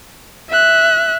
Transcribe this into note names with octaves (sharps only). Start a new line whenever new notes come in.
E5 F#6